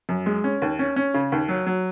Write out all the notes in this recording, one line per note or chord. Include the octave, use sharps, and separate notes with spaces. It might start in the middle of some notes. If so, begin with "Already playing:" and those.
F#2
G#3
C#4
D#2
C#4
C#4
C#3
D#2
F#3
F#3